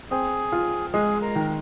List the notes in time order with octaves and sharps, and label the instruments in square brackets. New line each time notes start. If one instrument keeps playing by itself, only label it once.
[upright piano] C4 [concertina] G#4
[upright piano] F4
[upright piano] G#3 [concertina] G#4
[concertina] A#4
[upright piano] D#3